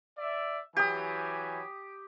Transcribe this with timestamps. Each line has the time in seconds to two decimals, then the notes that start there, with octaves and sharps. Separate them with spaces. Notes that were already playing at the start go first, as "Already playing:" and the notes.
0.18 D5 E5
0.77 E3 F#3 G4 G#5 D#6